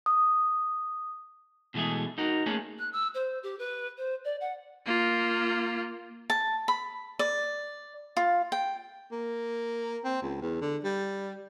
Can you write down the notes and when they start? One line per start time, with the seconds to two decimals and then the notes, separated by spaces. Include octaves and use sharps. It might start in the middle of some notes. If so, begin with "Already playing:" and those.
0.06 D#6
1.74 B2 E3 G#3 A3 G#4
2.18 D#4 F#4 A#4
2.46 A3 A#3 C#4 G#4 A4
2.79 F#6
2.93 E6
3.14 C5
3.43 G4
3.59 B4
3.98 C5
4.25 D5
4.41 F#5
4.87 A#3 F4
6.30 A5
6.68 B5
7.19 D5
8.17 F4
8.52 G5
9.11 A#3
10.04 C4
10.22 C#2
10.41 E2
10.61 D3
10.84 G3